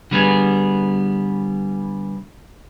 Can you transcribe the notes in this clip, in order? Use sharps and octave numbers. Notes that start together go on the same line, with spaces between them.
D3 G3 B3 G#4